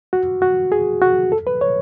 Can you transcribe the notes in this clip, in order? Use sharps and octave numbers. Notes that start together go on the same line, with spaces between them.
F#4
F#4
G#4
F#4
A4
B4
C#5